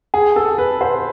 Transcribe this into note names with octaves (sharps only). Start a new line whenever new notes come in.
G#4
A4
B4
C5